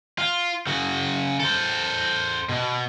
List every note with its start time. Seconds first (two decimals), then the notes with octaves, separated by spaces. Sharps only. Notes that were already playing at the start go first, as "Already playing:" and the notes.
0.18 F4
0.67 C#3 F#4
1.40 A4 C5
2.49 B2